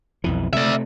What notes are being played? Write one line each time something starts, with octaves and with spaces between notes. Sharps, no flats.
B1 F2 E3
C3 G#3 A3 D5 E5